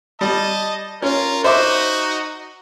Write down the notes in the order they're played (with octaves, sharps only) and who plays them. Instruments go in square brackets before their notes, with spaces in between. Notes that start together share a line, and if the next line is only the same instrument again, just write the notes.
[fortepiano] G3 [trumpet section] D#5 A5
[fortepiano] C#4 [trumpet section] F4 A#4
[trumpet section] D#4 F#4 [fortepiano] C5 E5 D6